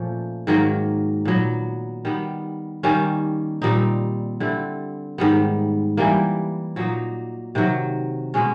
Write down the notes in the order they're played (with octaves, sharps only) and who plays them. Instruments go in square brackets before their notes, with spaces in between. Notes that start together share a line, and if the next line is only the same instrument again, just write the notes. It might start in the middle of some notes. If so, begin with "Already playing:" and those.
Already playing: [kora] A#2 F3 A3 C#4
G#2 D#3 F#3 A#3
A#2 F#3 B3
D#3 G3 B3
D#3 G3 A#3 C#4
A#2 G3 C4 D#4
D3 G3 C4 E4
G#2 D#3 G3 B3
E3 G3 A#3
A#2 F#3 A#3 D#4
C3 D#3 F#3
B2 G#3 C#4